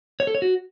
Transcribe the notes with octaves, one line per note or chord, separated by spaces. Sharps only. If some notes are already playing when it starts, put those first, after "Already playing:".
C#5
A4
C#5
F#4